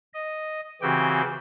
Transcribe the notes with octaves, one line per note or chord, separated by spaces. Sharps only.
D#5
C#3 E3 C4 F#4 G4 G5